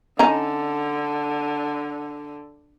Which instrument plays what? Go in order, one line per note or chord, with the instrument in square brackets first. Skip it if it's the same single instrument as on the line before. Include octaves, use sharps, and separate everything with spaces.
[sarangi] D3 [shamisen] C#4 D#4 A#5